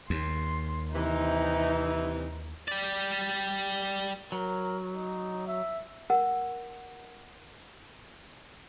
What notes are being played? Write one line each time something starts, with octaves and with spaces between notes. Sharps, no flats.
D#2 C6
C3 E3 D#4
G3 D5
F#3 A#4
D#4
E5
A#4 F#5 E6